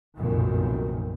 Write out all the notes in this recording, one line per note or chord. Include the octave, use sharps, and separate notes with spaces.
F1 B1 F#2 A#2 D#3